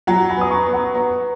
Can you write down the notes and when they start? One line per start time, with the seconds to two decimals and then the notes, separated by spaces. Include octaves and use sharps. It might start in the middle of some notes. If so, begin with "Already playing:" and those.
0.07 F#3 F#5 A#5
0.30 G#5 B5
0.37 B3 D#6
0.51 A#5 C#6
0.66 B3
0.73 F#5 A#5
0.94 B3 A#5 C#6